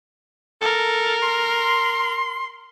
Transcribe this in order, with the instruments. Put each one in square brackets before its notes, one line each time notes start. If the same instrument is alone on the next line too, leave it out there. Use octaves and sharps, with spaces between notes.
[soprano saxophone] A4 [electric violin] A#4
[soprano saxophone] C6